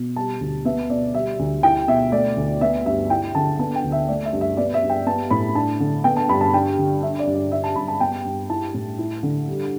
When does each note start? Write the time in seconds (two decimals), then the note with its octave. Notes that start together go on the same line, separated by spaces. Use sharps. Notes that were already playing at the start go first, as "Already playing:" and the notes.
Already playing: B2
0.16 G3 A5
0.41 D2
0.65 B3 E5
0.90 B2 D5
1.14 G3 E5
1.39 D2
1.63 E4 G5
1.88 B2 E5
2.12 A3 D5
2.37 D2
2.61 B3 E5
2.86 G2 E5
3.10 E4 G5
3.35 D3 A5
3.59 B3 A5
3.76 G5
3.84 D2
3.92 E5
4.08 A3 D5
4.25 E5
4.33 G2
4.41 E5
4.57 B3 D5
4.74 E5
4.82 G2
4.90 G5
5.06 B3 A5
5.31 A2 B5
5.55 D4 A5
5.80 D3
6.04 B3 G5
6.17 A5
6.29 G2 B5
6.41 A5
6.53 D4 G5
6.78 D3
7.02 D4 E5
7.19 D5
7.27 G2
7.35 D5
7.52 D4 E5
7.64 A5
7.76 G2 B5
7.88 A5
8.00 B3 G5
8.25 G2
8.50 E4 A5
8.74 A2
8.98 E4
9.23 D3
9.48 G3